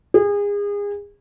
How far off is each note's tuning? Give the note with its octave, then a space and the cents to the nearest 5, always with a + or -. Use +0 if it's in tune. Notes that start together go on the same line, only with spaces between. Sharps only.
G#4 -30